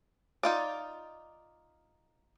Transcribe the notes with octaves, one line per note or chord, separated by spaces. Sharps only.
D#4 F4 D5